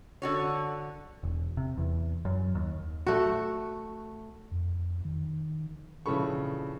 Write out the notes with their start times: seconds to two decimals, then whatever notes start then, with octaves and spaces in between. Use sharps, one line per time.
0.22 D3 F#4 C#5
1.23 E1
1.57 C3
1.77 E2
2.25 F#2
2.55 D#2
3.07 A3 F#4
4.52 F2
5.05 D#3
6.06 A#1 C#3 E3 A4 B5 C#6